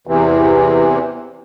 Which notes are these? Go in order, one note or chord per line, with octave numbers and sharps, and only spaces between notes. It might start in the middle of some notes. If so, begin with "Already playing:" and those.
E2 C3 E3